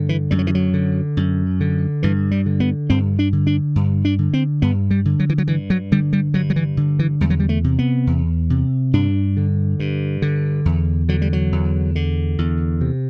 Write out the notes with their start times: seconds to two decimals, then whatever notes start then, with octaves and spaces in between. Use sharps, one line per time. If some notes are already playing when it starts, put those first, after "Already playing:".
Already playing: G2 D3
0.09 E3
0.31 F#2 G3
0.39 F#3
0.47 E3
0.55 F#3
0.74 D3
1.17 F#2
1.60 D3
2.03 G2 E3
2.31 G3
2.46 D3
2.60 B3
2.90 G2 C4
3.19 D4
3.33 D3
3.47 D4
3.76 G2
4.05 D4
4.19 D3
4.33 C4
4.62 G2 B3
4.91 G3
5.05 D3
5.20 F#3
5.29 E3
5.38 F#3
5.48 G2 E3
5.70 F#3
5.92 D3 G3
6.13 G3
6.34 G2 F#3
6.50 F#3
6.56 E3
6.77 D3
6.99 E3
7.21 E2 G3
7.30 F#3
7.40 G3
7.49 A3
7.64 C3
7.79 B3
8.07 E2
8.50 C3
8.93 G2 D4
9.37 D3
9.80 G2
10.22 D3
10.65 E2
11.09 D3 F#3
11.22 G3
11.33 F#3
11.52 E2
11.95 D3
12.38 E2
12.81 C3